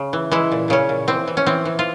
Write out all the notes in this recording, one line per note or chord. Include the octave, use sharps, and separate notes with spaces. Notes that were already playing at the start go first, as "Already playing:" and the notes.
Already playing: C#3
E3
E3 G#3 E4
A#2
A#2 C#3 C#4
A#2
E3 C4
E3
C#4
E3 C4
E3
F4